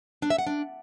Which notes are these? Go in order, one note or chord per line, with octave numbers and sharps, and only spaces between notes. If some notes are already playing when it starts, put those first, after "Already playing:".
D4
E5
F#5
D4